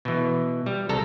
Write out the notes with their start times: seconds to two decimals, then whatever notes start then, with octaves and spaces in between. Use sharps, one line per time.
0.05 B2 E3
0.66 G3
0.89 C2 A4 A5 A#5